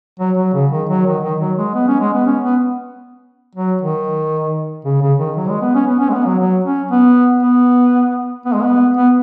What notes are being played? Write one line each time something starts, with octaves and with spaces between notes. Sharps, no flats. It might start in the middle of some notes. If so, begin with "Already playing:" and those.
F#3
F#3
C#3
D#3
F#3
D#3
D#3
F#3
G#3
B3
C#4
G#3
B3
C#4
B3
F#3
D#3
C#3
C#3
D#3
F#3
G#3
B3
C#4
B3
C#4
G#3
B3
F#3
F#3
C#4
B3
B3
B3
G#3
B3
B3